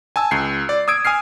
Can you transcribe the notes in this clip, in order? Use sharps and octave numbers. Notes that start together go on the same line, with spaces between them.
G#5 A5 E6
C#2 C7
D5
D#6 E6 G#6 D7
G#5 D#6 F6 C7